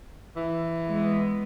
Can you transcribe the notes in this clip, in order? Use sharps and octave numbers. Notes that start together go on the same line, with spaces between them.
E3
G#3 B3